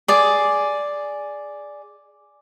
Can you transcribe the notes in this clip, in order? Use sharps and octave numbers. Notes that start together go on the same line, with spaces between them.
G#4 D5